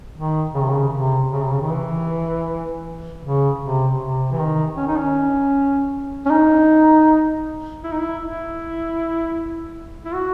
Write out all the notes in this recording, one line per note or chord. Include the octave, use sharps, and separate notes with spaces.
D#3
C#3
C3
C#3
C3
C#3
C3
C#3
D#3
E3
C#3
C3
C3
E3
D#3
C#4
D#4
C#4
C#4
D#4
E4
D#4
E4
E4
E4
F#4